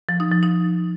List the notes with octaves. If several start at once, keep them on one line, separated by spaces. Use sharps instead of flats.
F3
D#4
F3
D#4